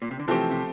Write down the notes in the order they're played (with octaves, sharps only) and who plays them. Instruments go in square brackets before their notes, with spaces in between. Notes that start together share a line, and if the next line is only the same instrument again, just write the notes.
[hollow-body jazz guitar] A#2
C3
D3
[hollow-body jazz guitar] C3 E3 [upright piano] F3 A3 C4 G4
[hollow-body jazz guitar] C3